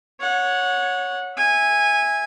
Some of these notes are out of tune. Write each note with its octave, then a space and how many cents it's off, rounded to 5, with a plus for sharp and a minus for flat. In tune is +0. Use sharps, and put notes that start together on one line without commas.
C#5 +0 F#5 -20
E5 -10 G#5 -15